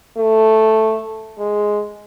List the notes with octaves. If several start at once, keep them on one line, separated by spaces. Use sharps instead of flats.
A3
G#3